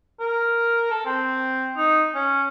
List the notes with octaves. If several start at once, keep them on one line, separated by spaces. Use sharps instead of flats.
A#4
A4
C4
D#4
C#4